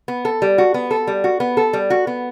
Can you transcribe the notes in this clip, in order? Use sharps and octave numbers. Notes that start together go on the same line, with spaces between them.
B3
A4
G3
F#4
B3
A4
G3
F#4
B3
A4
G3
F#4
B3